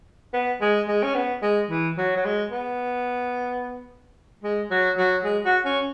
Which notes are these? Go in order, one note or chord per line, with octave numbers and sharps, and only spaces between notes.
B3
G#3
G#3
C#4
B3
G#3
E3
F#3
F#3
G#3
B3
G#3
F#3
F#3
G#3
F#4
C#4